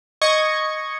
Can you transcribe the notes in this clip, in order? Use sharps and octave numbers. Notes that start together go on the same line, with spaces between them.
D#5 C#6 G#6 C#7